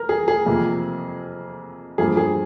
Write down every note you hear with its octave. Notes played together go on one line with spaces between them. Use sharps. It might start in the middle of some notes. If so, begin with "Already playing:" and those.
Already playing: A#4
G#4
G#4
F2 C3 F3 A#3
G2 F3 A#3 G#4
G#4